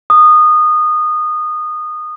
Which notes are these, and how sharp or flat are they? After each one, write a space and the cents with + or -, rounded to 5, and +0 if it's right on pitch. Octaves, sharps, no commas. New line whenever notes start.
D#6 -20